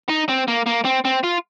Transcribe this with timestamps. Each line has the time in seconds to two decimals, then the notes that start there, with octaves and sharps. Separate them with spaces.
0.09 D#4
0.29 C4
0.48 A#3
0.66 A#3
0.85 C4
1.05 C4
1.23 F4